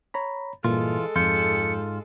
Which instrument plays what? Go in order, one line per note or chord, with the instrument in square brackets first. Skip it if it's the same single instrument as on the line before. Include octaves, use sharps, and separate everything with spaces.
[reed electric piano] C#5 A#5 B5
[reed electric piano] G2 A#2 [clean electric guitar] E3 F4 [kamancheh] G#3 A4
[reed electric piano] F2 G6 [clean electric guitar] G#2 F4 [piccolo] C#7